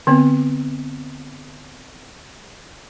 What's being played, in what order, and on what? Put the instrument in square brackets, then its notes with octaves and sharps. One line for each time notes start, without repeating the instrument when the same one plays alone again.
[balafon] D3 B3 C4